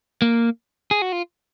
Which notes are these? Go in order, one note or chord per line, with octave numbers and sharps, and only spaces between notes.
A#3
G#4
F#4
F4